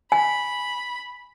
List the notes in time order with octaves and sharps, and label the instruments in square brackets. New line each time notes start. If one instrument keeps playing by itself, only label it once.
[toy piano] G#5 [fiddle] B5